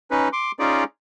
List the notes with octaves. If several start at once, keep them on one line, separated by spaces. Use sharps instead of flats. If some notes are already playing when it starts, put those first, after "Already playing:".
C#4 D#4 B4
C6 D6
C#4 D#4 F4 G#4 D5